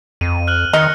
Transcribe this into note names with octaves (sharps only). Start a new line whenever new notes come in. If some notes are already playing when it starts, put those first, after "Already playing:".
F2 D#7
F6 F#6 F#7
D#3 D#4 F6 A#6 C#7